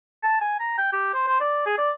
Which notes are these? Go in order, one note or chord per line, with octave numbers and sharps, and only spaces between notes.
A5
G#5
A#5
G5
G4
C5
C5
D5
G#4
D5